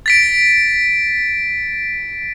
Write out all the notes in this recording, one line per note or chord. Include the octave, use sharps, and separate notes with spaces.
A6 B6 D7